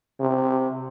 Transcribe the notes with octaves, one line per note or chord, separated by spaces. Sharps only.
C3